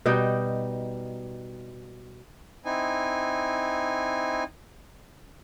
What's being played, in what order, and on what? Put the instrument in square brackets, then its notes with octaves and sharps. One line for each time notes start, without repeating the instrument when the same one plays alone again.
[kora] B2 G3 D#4 G5
[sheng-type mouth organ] C4 D#4 E4 G#5